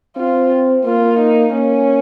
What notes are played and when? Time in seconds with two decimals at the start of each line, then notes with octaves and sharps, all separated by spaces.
0.16 C4 F4
0.85 A#3 F4
1.19 D#4
1.53 A#3 C#4